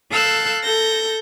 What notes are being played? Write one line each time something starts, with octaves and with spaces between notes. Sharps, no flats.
A4 F5 E6 F#6 G6
A4 G6 A#6